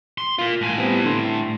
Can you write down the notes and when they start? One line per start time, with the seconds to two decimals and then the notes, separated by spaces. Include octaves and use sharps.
0.18 C6
0.38 F4 A#4 F5
0.61 A2 G#5
0.78 G3 B3 C4
1.05 D3 C6